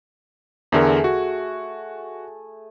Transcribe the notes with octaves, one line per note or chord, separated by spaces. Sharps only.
E2 D3 A3 G#4 A#4
F#4